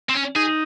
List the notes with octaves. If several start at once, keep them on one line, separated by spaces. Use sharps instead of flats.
C4
C#4
D#4 G#4